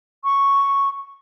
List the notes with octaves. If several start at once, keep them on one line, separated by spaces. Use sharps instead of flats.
C#6